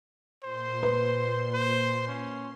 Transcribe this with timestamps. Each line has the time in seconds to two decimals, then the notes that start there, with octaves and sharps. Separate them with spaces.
0.43 A#2 C5 C6
0.83 B4
1.53 C5
2.07 C#4